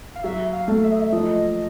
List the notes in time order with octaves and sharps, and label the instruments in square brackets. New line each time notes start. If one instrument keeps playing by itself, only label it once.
[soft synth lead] F5
[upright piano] F#3 [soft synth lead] E5
[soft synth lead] F5
[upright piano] A3
[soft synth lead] E5
D#5
E5
[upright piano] F3 [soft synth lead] D#5